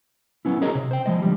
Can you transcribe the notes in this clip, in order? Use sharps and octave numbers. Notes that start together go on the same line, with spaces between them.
F#3 B3 C#4 E4
C#4 F#4 G#4 A#4 C#5 D#5
C3
C5 G5
F3 G#3 D#5
D3 F3 G3